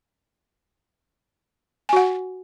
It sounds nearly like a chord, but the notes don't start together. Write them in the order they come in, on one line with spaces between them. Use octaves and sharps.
G#5 F#4 F#5